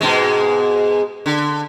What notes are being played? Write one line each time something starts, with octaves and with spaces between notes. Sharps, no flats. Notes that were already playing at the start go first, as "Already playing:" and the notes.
G#2 B2 G#3
D3